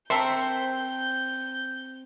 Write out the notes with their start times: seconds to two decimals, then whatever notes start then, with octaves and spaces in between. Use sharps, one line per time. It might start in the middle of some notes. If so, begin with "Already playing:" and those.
0.10 C4 A#4 E5 A5 A#5 C6 C#6 G6